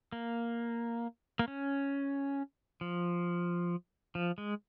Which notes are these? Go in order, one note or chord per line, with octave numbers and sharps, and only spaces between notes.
A#3
A#3
C#4
F3
F3
G#3